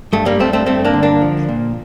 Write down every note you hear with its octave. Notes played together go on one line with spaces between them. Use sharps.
G2 A3
G3 A#3
G2 A3 C4
A3 C4
G2 A3 C4
A#3 D4
D3
A#3 D4
F3
A#2